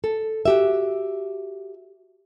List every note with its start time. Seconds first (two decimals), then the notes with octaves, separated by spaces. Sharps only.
0.04 A4
0.45 F#4 G4 E5